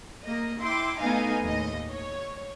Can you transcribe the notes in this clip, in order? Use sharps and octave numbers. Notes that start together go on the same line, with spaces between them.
A#3 D#5
E4 G5 C6 D6
A3 B3 D#4 D#5 F5 G#5
D#2 A2 D#5
C#5